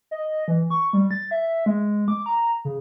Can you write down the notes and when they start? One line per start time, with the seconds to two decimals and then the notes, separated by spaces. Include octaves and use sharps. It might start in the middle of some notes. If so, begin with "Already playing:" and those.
0.11 D#5
0.48 E3
0.70 C#6
0.93 G3
1.11 A6
1.31 E5
1.66 G#3
2.08 D6
2.26 A#5
2.65 C#3